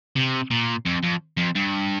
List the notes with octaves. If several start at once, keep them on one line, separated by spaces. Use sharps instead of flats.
C3
A#2
F2
F2
F2
G2